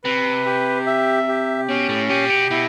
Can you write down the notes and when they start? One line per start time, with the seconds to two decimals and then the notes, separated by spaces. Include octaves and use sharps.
0.04 C3 B4
0.45 G4
0.87 E5
1.28 G4
1.69 B2 C#4
1.89 A2
2.09 A#2 G4
2.30 B2
2.51 B2 E4